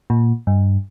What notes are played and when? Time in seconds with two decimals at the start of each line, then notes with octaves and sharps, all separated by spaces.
0.10 A#2
0.47 G2